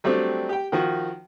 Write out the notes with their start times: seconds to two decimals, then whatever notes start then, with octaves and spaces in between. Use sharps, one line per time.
0.04 F#3 G3 A3 C4 D4
0.49 G4 G5
0.72 D#3 F3 F#4